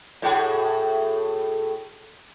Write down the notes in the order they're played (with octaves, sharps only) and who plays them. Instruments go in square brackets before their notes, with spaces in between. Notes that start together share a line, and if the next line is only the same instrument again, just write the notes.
[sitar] A2 F#4 G#4